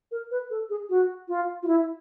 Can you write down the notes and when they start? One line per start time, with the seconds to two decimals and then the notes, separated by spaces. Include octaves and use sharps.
0.12 A#4
0.31 B4
0.50 A4
0.70 G#4
0.90 F#4
1.28 F4
1.63 F4
1.68 E4